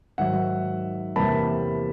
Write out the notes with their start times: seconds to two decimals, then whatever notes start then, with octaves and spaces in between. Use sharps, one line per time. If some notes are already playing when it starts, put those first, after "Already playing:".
0.18 G#2 D#3 F#3 E5 F#5
1.16 E2 C3 E3 G3 A#3 A5 B5